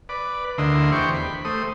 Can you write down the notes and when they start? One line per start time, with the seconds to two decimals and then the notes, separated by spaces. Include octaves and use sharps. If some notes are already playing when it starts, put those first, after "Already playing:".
0.09 B4 D5
0.58 D2 D3 E4 A#4 D#5 C6
0.92 E2 G4 C5 C#6 D6
1.14 B5
1.45 A3 C5 D#6